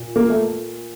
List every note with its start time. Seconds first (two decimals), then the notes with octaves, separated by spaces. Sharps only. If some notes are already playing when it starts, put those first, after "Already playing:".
Already playing: A#2
0.16 A#3
0.30 A3